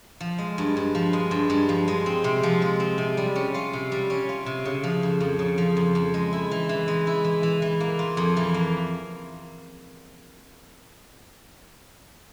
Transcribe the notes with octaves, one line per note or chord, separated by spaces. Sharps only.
F3
G#3
G2
G2
F3
G#3
G2
G2
F3
G#3
C4
C3
F3
G#3
C4
C3
G3
C#4
F4
C3
G3
C#4
F4
C3
C#3
F3
F2
F2
C#3
F3
F2
F2
G#3
E4
E3
E3
G#3
E4
E3
E3
E3
A#3
F4
F2
E3
A#3